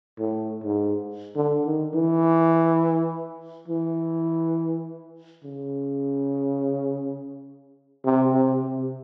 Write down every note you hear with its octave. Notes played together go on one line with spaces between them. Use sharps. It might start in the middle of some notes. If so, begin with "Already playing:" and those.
A2
G#2
D3
D#3
E3
E3
C#3
C3
C3
C3